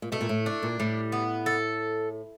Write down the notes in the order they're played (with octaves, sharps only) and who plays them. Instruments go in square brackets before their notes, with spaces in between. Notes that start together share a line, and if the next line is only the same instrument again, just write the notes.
[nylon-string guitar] A#2
[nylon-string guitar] B2 [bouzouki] A3
[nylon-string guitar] A#2
A2
[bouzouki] D4
[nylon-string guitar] A#2
[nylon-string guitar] A2 [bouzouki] G3
[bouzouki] B3
A4